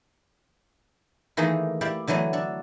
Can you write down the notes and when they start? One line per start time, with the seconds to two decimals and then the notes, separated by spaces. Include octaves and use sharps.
1.37 D#3 E3 A3 A#3 D#4 G#4
1.81 E4 G4 D5 F5
2.07 D3 E3 F#3 A3 B3
2.33 D4 A4